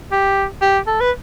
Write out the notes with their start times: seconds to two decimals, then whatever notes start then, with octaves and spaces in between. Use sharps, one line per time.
0.12 G4
0.62 G4
0.87 A4
1.00 B4